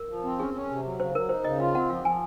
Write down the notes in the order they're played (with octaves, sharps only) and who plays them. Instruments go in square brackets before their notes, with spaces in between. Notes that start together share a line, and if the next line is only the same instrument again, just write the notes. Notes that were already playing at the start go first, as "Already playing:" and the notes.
Already playing: [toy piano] A#4
[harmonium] F3
C4
[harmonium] C#4 [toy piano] G#4
[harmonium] C#4
C3
F#3
[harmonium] C#3 [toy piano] C5
[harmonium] F#3 [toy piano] A#4
[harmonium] D#4 [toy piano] C5
[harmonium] C#3 [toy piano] D#5
[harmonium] F4 [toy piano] F5
[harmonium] C4 [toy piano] F#5
[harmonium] F3 [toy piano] F5
[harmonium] F3 [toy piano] G#5